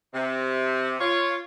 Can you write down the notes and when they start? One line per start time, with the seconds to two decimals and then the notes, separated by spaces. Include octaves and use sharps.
0.14 C3
1.00 F4 C#5